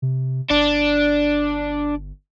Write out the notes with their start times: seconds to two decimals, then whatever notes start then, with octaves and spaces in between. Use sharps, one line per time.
0.02 C3
0.50 G1 D4